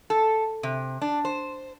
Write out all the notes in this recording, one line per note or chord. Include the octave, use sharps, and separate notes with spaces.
A4
C3
D4
C5